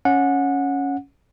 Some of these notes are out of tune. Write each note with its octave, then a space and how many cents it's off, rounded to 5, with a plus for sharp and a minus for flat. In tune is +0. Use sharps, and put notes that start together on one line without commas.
C#4 +0 F#5 -20